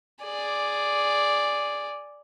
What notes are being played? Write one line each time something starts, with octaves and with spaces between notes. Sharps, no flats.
G#4 D5